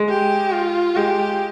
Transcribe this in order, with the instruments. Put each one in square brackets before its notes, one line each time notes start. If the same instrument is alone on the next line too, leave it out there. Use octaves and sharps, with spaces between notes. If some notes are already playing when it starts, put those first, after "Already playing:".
Already playing: [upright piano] G#3
[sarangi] G4
F4
[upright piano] G#3 [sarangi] G4